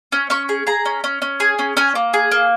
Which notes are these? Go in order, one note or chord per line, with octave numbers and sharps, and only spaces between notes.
C#4
C#4 C#6
G#4
G#4 A#5
C#4
C#4
C#4
G#4
C#4
C#4 G#5
A#3
G#4
A#3